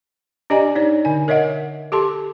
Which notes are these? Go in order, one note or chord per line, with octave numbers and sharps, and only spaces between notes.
D4 G4 D5 D#5 G#5 A#5
D#4 C#5 D5
D3 G#5
A#4 C#5 D#5 E5 F#5
G4 A4 A5 C6